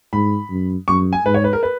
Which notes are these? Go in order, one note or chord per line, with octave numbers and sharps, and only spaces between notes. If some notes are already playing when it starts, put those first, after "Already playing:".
G#2 B5
F#2
F#2 C#6
G#5
G#2 B4
C#5
B4
A#4
B4